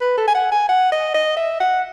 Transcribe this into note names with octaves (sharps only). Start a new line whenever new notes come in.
B4
A4
G#5
F#5
G#5
F#5
D#5
D#5
E5
F#5